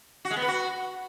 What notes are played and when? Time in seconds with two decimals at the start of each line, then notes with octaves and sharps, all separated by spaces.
0.25 F#4
0.31 G#3
0.36 B3
0.42 B4
0.48 F#4